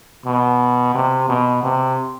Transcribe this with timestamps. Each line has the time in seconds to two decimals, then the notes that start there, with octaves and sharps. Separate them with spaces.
0.26 B2
0.95 C3
1.29 B2
1.63 C3